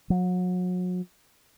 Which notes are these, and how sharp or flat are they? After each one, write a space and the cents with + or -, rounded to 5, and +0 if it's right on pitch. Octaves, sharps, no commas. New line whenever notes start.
F#3 -35